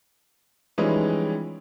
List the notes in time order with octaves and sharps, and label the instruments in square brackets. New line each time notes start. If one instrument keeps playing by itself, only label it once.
[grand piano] E3 F3 G3 G#3 C#4 D#4